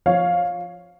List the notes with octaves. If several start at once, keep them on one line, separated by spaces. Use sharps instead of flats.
F3 C#5 F5